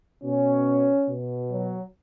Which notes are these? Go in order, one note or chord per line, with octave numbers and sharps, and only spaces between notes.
B2 C#4
B2
F#3